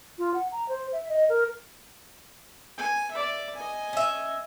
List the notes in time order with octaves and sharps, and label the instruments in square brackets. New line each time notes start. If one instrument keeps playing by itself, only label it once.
[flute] F4
F#5
A#5
C5
E5
D#5
A#4
[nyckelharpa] G#5
D5 E5
D#5 G#5
[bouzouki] C#4 E5